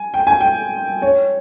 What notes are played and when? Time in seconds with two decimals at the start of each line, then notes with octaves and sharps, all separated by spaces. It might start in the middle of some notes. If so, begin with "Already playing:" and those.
Already playing: G#5
0.14 G5
0.27 G#5
0.41 G5
1.02 C#5